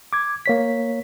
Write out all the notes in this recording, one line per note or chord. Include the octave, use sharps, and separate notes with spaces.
D6 G#6
A#3 C#5 B6